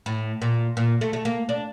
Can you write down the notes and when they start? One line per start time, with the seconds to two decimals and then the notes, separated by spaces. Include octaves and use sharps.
0.06 A2
0.42 A#2
0.77 A#2
1.01 A3
1.13 A3
1.25 A#3
1.49 D4